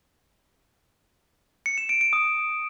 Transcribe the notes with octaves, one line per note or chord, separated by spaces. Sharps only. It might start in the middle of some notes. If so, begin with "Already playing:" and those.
C#7
E7
D7
D7
D#6